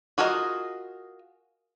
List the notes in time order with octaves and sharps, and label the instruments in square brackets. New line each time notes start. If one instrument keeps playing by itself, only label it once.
[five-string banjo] F4 F#4 G#4 A#4 D#5